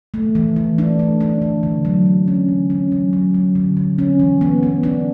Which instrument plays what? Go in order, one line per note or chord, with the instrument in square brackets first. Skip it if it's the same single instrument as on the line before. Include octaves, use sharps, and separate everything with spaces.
[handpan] A3
E3
E3
D4
A3
D4
E3
D3
F#3
F#3
C#4
D3
C#4
F#3
F#3
F#3
D3
D3
C#4
E3
B3
B3
D4